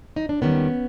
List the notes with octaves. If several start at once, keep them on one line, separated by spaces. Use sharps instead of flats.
D#4
D4
D#2 D#3 G3 B3 C#4